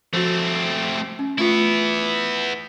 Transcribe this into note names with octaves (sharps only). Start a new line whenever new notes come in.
F3 A3 C4 F#4
C#4
A3 B3 E4 F4